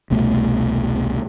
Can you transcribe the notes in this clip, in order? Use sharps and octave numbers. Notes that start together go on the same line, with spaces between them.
E1 C2 B2 A3